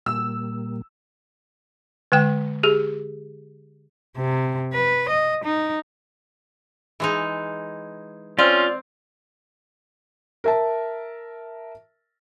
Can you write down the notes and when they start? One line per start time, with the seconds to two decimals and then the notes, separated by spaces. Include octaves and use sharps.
0.06 A#2 G3 A#3 E6
2.12 D3 G#3 G5
2.63 G4 G#4
4.17 C3
4.73 B4
5.09 D#5
5.44 D#4
7.00 E3 G#3 D#4
8.39 C4 C#4 F4 D5
10.44 A#4 E5 A5